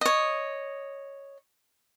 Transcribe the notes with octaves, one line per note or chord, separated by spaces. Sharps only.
C#5 D#5